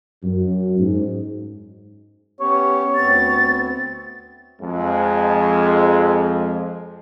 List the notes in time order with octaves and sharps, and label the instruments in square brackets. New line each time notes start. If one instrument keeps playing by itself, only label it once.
[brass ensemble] F#2
G#2
[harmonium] B3 C#4 G4 [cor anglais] C#5
[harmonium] D2 B3 C4 [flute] A6
[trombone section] F2 G#3